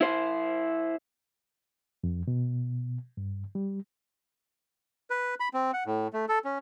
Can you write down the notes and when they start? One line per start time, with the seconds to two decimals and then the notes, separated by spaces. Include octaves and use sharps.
0.01 E4 C5
2.04 F2
2.27 B2
3.17 G2
3.55 G3
5.10 B4
5.40 B5
5.54 C4
5.74 F#5
5.86 A2
6.13 A3
6.29 A4
6.45 C#4